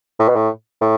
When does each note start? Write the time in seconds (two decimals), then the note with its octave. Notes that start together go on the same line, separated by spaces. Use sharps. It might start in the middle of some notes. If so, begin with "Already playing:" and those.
0.20 A2
0.28 B2
0.36 A2
0.81 A2